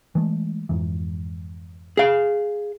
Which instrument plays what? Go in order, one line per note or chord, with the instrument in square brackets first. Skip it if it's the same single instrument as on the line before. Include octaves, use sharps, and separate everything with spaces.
[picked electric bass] E3 G#3 A3
F2 G#2 E3
[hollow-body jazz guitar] G#4 F5